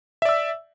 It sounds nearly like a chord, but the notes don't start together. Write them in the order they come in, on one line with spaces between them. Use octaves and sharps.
E5 D5 E6